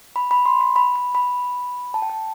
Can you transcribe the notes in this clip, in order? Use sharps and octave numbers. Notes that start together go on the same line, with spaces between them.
B5
B5
C6
B5
B5
B5
B5
A5
G5
A5